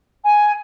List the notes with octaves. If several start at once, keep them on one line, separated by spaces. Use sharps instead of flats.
G#5